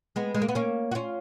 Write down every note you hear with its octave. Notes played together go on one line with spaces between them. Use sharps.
G#3 B3
G#3
A#3
B3
A#3 C#4
F#4
C#4 F4